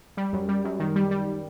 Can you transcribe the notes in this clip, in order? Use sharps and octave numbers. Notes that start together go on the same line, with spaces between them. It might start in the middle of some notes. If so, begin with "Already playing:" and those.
G3
F#2
G3
F#2
D#3
G3
G3